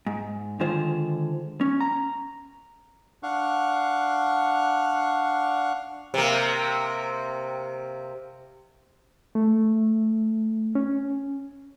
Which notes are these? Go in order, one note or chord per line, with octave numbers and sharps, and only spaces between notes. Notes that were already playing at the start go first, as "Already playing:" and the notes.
G#2
D3 D#3 G#3 F4 C5
C#4
A#5
D4 F5 F#5 C#6
C3 A#3
A3
C#4